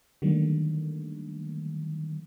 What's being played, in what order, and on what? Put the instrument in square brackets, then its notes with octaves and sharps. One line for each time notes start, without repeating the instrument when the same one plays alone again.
[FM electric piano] D3 D#3 F#3 G3 A3 A#3